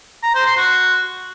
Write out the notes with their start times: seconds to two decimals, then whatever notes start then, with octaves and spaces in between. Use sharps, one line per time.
0.23 A#5
0.35 C5
0.46 C6
0.57 F#4